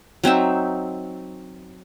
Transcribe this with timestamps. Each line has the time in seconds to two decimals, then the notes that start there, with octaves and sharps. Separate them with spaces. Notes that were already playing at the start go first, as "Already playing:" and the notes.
0.24 F#3 C4 D#4 E5